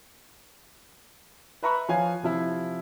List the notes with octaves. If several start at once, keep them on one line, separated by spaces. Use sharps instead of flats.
B4 E5 A#5 B5 C#6 F#6
F3 C#5 F5 G#5
C3 F3 E4